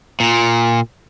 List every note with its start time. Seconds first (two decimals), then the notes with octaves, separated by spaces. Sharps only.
0.20 A#2